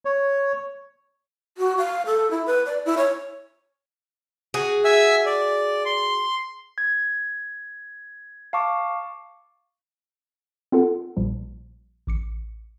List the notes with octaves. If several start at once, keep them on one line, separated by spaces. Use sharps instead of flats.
C#5
F#4
F5
A4
E4
B4
D5
E4
C#5
F#4 G#4
E5 G#5 E6
D5
C6
G#6
F5 A5 C#6 D6
C4 F4 A4 F#5
A#1 A#2 F3 G3
A1 D6 C#7